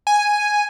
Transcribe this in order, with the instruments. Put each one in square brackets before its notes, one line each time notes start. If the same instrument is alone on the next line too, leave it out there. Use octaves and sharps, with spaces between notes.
[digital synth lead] G#5